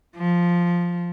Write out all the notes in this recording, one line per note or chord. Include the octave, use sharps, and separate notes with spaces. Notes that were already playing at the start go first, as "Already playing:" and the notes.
F3